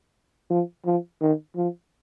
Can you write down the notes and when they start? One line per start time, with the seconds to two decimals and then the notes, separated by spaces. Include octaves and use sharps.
0.50 F3
0.86 F3
1.22 D#3
1.56 F3